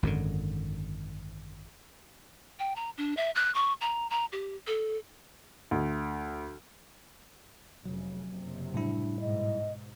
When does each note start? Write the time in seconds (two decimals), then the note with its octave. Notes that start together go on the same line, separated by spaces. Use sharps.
0.03 G#1 F#2 A#2 D3
2.59 G5
2.76 A#5
2.98 D4
3.17 E5
3.35 F#6
3.55 C#6
3.81 A#5
4.10 A#5
4.32 G4
4.67 A4
5.71 D2
7.86 F1 C#3 F#3
8.27 F#1 C3
8.74 A2 G3 D4 E4
9.20 G#2 B2 D#5